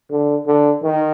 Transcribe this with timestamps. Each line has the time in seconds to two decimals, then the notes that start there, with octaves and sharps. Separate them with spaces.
0.11 D3
0.47 D3
0.83 D#3